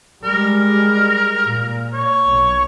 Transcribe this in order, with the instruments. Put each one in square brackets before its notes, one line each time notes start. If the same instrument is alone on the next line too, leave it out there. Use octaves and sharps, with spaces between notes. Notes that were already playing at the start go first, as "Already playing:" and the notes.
[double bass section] G3 G#3 [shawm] A#4
[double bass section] A#2
[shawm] C#5
[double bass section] B1